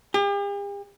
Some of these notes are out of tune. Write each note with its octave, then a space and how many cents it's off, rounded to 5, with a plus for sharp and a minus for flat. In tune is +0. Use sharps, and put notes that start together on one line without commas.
G4 +45